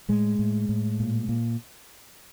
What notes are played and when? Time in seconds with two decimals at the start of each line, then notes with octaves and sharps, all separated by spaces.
0.09 A2 G#3
0.39 A2
0.69 A2
1.00 A#2
1.29 A#2